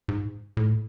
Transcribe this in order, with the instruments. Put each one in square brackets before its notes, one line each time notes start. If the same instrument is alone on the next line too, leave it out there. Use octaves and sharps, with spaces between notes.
[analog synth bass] G#2
A2